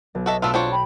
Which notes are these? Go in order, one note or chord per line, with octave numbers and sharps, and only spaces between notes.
B1
F#4 A4 D#5 E5
B2 A3 D4 F4 B5 E6
C4 D4 F4 C#5
G5 B5